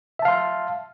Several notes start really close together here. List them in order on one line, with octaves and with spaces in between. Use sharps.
E5 A5 F5 C6